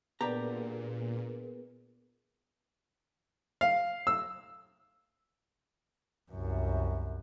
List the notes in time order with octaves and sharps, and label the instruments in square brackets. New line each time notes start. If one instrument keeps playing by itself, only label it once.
[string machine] A#2 [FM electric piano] B3 [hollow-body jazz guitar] D4 G4 A#5 [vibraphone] G#4 A#4 B4
[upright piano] F5
E6
[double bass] C2 F#2